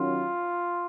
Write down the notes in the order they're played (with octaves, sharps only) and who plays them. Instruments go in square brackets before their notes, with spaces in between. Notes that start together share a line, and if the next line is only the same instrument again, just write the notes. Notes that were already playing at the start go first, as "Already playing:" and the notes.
Already playing: [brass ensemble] D#3 F#3 C#4 F4